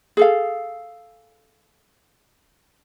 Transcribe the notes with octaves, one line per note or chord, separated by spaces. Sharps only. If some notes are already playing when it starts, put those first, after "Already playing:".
G#4 A4 F5